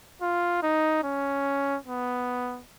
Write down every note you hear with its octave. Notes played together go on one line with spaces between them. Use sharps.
F4
D#4
C#4
B3